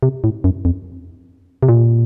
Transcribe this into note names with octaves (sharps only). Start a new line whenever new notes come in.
C3
A2
F#2
F2
C3
A#2